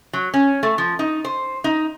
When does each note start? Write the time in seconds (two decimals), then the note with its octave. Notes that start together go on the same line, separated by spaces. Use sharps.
0.13 F#3
0.34 C#4
0.63 A3
0.78 F3
0.99 D#4
1.25 C5
1.64 D#4